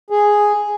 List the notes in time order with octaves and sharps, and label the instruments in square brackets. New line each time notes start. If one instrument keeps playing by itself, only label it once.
[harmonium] G#4